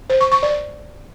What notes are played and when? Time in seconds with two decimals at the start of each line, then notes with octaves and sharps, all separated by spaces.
0.10 C5
0.21 C#6
0.32 C#6
0.43 D5